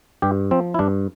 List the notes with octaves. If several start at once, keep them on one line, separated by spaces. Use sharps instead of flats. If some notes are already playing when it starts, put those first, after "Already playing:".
G2 G4
F3 C4
E4
G2 D4